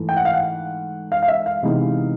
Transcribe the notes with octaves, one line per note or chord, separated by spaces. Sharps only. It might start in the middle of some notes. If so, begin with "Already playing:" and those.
Already playing: G#2 E3 A3
G5
F#5
F5
F#5
F5
F5
E5
F5
C3 E3 G#3 B3 D#4